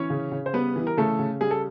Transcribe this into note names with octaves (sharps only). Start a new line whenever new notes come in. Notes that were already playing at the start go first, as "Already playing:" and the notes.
Already playing: E3 C#4 C#5
C#3
C#3
C5
G3 B3 B4
E3
A#4
C#3 A3 A4
C#3
G3 G#4
A4